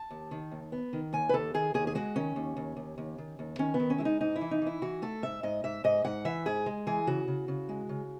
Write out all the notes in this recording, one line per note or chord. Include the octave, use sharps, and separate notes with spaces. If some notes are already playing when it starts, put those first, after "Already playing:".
Already playing: A5
D#2
D#3
D#2
B3
D#3
D#2 G#5
B4
D#2 A4
D#3 G#4
D#2 G#4
G#4
G#3 F#4
D#3 C#4
D#2
D#2
D#2
D#2
D#3
D#2
D#3 C#4
B3
D#3
C#4
G#3 E4
D#4
G#2 D#4
E4
E3
D#4
E3 E4
E3 F#4
A3 A4
G#2 E5
G#2 D#5
G#2 E5
G#2 D#5
G#2 F#5
E3 E5
G#2 G#4
G#3
E3 G#4
C#3 F#4
C#3
C#3
G#3
C#3